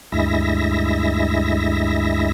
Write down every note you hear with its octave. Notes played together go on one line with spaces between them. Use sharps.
D2 G2 G#3 E4 E5 A#6